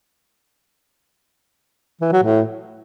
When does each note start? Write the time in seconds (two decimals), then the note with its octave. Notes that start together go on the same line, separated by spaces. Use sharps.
2.01 E3
2.12 F#3
2.23 A2